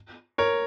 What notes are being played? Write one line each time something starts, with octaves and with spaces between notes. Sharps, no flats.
A#4 C#5